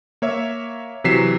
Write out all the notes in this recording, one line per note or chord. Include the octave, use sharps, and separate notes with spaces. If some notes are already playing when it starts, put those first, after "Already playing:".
A#3 C#5 E5
C3 E3 F#3 B6 C7 E7